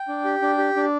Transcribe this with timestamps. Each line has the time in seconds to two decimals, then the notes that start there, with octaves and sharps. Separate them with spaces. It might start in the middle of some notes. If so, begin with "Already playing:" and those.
Already playing: G5
0.08 D4
0.24 G4
0.42 D4
0.58 G4
0.76 D4